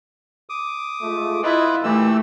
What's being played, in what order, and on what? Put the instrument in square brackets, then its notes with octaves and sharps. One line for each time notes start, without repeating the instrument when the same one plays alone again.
[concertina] D6 D#6
[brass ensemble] G#3 A3 F4
[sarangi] E4 [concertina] F4 B4 [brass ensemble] D#5
[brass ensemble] A#2 [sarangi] E3 [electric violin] A3 [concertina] G4 E6